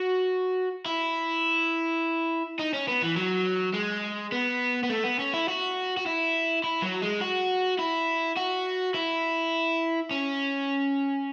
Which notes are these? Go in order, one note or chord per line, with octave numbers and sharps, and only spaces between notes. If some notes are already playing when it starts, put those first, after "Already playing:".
Already playing: F#4
E4
D#4
C#4
B3
E3
F#3
G#3
B3
B3
A3
B3
C#4
E4
F#4
F#4
E4
E4
F#3
G#3
F#4
E4
F#4
E4
C#4